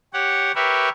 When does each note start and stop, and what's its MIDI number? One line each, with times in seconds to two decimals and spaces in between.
0.13 0.52 67
0.13 0.52 73
0.13 0.52 78
0.55 0.89 67
0.55 0.89 70
0.55 0.89 71
0.55 0.89 73
0.55 0.89 76